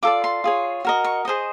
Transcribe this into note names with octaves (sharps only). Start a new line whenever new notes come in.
F4 A4 D5 D6
C6
F4 G#4 C#5
F#4 A#4 D#5
C#6
G#4 C5 D#5